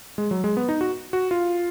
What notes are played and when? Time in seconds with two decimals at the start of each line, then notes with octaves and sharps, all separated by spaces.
0.18 G#3
0.31 F#3
0.44 G#3
0.57 B3
0.69 D#4
0.81 F#4
1.13 F#4
1.31 F4